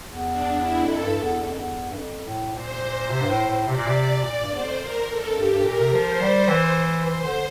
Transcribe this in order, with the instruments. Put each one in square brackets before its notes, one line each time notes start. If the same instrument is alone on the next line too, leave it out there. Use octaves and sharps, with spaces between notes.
[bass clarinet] E2
[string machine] D4
E4
[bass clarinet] F2 [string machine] A4
[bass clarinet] G2
E2
E2
F2
E2
G2
F2
A2
[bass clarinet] A#2 [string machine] C5
[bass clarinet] C3
G2
A2
A2
[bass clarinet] C3 [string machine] D5
[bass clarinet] A#2
C3
[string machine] D5
[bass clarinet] A#2 [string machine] D5
[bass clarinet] G2
[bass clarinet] E2 [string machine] C5
[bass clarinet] F2
[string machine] A#4
A4
[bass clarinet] F2
[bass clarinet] G2 [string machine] G4
[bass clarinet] G2
[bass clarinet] A#2 [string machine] A#4
[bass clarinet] C3
[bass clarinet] F3 [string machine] C5
[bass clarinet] G3
E3
[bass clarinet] E3 [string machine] C5
[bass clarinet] E3
D3